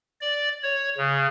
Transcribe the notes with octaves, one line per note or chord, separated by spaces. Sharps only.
D5
C#5
C#3